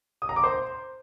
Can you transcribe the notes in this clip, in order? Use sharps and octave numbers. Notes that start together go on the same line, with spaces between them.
D#6
A#5
D6
C5